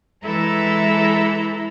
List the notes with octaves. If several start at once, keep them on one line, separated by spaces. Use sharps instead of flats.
E3 G#3 E4 A4 E5 A#5